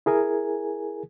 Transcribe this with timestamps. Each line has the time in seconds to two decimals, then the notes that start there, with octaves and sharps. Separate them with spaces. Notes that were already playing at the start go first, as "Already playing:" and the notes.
0.06 E4 G#4 A#4 G#5